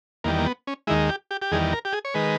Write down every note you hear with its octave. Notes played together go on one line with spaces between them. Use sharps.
E2 D#3 G3 A#3
A#3
B3
C#4
D#2 D#3 G#3 E4
G4
G4
G4
E2 D#3 G3 G#4
A#4
G4
G#4
C#5
D#3 G#3 B4